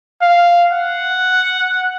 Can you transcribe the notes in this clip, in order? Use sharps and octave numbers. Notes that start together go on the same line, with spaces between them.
F5
F#5